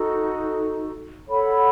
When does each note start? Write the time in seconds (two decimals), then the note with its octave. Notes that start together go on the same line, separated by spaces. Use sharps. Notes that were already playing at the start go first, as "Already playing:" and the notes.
Already playing: D#4 F#4 A4
1.28 A4 C#5 F#5 B5